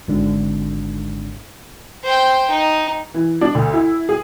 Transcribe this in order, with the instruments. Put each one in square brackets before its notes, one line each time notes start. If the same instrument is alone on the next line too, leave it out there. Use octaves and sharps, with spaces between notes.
[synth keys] G#1 D3
[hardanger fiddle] C5 G5
D#4
[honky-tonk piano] E3
D4
D2
E4
G#4